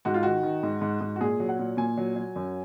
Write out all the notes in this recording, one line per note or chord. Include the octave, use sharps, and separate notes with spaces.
G#2 F#4
F4
D#3 F#4
D#3
G#2
G#2
G#2
F#4
A#2 G#4
F#3
F#5
A#2
A#2 G#5
F#3
F#3
F#2